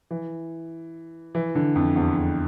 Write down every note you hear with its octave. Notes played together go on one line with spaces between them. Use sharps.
E3
E3
D3
F2
E2
F2